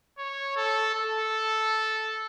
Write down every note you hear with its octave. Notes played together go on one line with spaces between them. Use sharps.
C#5
A4
A4